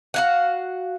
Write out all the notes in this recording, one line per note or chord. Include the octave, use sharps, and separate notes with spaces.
F#4 F5 F#5